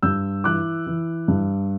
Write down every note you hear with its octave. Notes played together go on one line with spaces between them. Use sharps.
G2 E6 G6
E3 D6 F#6
E3
G2